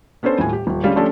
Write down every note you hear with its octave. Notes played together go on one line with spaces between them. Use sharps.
B3 C#4 D4 A4 C5
D#1 A2 G#5
G4
D#1
D3 G3 G#3 C#4 F5
F3 A3 C#4 D4 G4 A4